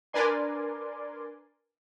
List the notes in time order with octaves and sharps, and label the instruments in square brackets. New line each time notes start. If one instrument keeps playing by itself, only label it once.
[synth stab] D4 A#4 B4 D5 G#5 C6